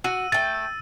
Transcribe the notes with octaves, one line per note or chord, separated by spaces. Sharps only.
F#4 E6 D#7
A3 G5 A6
E6